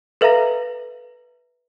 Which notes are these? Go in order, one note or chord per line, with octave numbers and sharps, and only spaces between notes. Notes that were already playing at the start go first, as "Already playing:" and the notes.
A4 B4 E5 F5 A#5 A#6